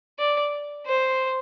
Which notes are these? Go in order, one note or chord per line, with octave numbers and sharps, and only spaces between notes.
D5
C5